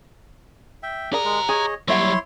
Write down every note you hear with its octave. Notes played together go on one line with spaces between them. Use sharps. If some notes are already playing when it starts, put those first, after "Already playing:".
E5 G5
G4 G#4 A#4 D5 A#5
G#3
G#4 C#5 D#5
F#3 G3 A#3 E4 C#5 E5 F#5 C6